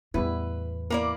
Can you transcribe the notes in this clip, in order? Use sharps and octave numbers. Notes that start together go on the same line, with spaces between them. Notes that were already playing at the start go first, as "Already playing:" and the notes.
E2 A2 G3 B3 E4 B4
A#3 E4 A#4 D5